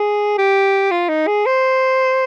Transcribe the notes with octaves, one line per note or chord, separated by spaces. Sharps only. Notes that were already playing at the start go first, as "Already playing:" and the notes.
Already playing: G#4
G4
F4
D#4
G#4
C5